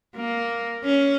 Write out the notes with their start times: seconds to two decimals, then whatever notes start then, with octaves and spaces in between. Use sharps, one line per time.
0.16 A#3
0.84 C#4